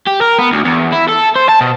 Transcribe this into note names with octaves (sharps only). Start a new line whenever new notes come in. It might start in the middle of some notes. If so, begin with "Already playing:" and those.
G4
A#4
B3
D2
E2
E4
A4
C5
A5
B2